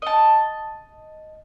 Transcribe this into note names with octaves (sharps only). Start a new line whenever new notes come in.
D#5 A5